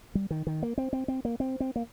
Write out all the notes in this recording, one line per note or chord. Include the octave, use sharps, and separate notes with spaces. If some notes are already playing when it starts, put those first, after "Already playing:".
G3
D#3
D#3
A#3
C4
C4
C4
A#3
C4
C4
A#3